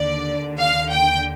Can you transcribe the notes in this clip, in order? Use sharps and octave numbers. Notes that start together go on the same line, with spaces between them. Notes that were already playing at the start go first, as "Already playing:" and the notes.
Already playing: D#2 D3 D5
F5
G5